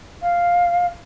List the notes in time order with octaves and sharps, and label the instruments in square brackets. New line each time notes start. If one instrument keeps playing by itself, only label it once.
[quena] F5